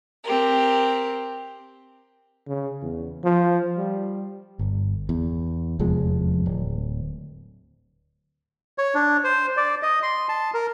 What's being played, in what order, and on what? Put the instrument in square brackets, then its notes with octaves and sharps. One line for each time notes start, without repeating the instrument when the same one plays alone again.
[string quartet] C4 G4 A#4
[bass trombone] C#3
E2
F3
G3
[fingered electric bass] G1
E2
F1 E2 F3 G#3
D1
[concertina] C#5
D4
C5
D5
D#5
C6
A5
A#4